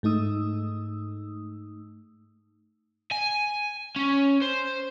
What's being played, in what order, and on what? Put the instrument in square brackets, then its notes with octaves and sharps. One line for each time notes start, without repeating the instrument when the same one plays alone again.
[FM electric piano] G#2 A3 D#4 D#6 E6
[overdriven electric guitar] G#5
C#4
C5